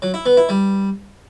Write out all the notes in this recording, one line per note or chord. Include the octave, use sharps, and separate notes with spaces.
F#3
E4
B3
E4
G3